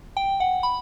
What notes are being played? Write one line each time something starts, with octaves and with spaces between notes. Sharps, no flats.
G5
F#5
B5